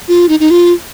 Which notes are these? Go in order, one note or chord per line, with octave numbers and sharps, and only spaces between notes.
F4
D#4
D#4
F4